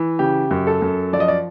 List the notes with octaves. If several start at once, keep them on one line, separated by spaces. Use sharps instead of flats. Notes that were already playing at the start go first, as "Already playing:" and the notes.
Already playing: E3
C#3 G4
F#2
A4
F#2
F3 D5
D#5
D5